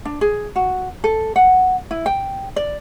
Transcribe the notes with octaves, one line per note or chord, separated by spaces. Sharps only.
D4
G#4
F#4
A4
F#5
E4
G5
D5